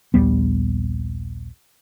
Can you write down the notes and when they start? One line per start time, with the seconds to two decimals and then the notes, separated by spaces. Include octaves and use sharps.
0.14 A#1 D#2 G3 B3